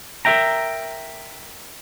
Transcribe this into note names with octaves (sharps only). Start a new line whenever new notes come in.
A#4 C5 E5 G5 A#5